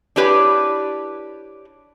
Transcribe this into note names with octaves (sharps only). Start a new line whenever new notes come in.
D4 E4 G4 B4 C#5 D5